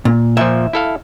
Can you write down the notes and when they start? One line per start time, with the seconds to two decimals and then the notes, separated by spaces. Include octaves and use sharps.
0.05 A#2
0.37 A#2 F3 E5
0.73 E4 A4 F5